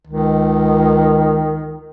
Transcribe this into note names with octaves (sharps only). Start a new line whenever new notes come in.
C#2 D#3